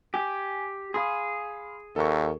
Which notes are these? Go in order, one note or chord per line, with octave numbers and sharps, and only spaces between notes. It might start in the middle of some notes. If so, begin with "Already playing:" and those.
G4 G#5
G#4 F5 B5 C6
D#2 A4 A#4 C#6